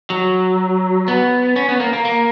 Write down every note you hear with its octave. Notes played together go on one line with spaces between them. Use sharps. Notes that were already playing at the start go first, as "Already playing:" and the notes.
F#3
B3
C#4
B3
A#3
A#3
A#3